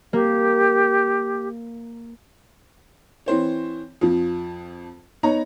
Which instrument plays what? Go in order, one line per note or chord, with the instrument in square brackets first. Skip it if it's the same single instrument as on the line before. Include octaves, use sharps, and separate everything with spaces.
[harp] A#3 [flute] G4
[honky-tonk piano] E3 C4 C5 C#5
F2 F3
B3 D#4 C#5 A#5